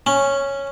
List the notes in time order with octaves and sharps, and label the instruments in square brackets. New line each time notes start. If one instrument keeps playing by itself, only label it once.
[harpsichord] C#4